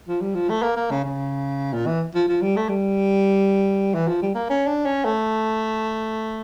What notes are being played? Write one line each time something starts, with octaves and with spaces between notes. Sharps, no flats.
F3
G3
F3
A3
A#3
A#3
C#3
C#3
A#2
E3
F3
F3
G3
A3
G3
E3
F3
G3
A#3
C#4
D4
C#4
A3